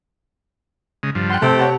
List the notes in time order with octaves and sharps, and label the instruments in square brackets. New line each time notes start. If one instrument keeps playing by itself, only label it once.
[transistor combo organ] C#3 G#3
G2 F3
[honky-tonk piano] F#5 G5 [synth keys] C6 F#6
[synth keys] C3 [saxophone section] A3 C4 [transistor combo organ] G4 [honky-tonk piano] A5
[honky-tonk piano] C#5 F#5 A5